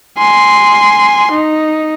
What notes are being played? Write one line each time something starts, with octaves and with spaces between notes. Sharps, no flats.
G#5 C6
D#4